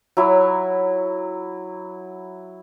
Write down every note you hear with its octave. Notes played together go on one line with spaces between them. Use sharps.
F#3 E4